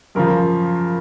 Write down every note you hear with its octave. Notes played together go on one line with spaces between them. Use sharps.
F#2 C#3 F3 A#4